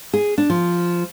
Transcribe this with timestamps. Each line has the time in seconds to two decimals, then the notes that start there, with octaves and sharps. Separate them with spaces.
0.13 G#4
0.38 D4
0.50 F3